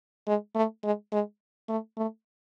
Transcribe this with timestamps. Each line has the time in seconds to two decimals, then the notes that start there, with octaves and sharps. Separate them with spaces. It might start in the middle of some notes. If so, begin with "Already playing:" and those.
0.27 G#3
0.55 A3
0.84 G#3
1.12 G#3
1.69 A3
1.97 A3